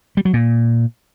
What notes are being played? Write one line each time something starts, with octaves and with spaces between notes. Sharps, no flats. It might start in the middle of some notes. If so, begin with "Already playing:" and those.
G3
F#3
A#2